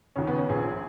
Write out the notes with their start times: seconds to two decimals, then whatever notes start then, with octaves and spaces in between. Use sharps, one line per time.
0.16 D#2 C#3 C#4
0.27 B3
0.38 C#4
0.49 A#1 A#2 G#4